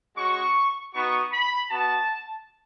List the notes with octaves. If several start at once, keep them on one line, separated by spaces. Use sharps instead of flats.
G#3 C#4 F#4 C#6
B3 D#4 F#4 C#6
B5
B3 F#4 A5